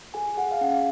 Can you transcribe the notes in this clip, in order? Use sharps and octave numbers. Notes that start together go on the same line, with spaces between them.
G#4 G#5
G#4 F#5
F5
C#4 F#5